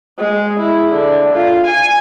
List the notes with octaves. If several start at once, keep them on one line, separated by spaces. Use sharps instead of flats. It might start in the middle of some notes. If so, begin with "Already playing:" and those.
G#3
E4
D3
F4
G#5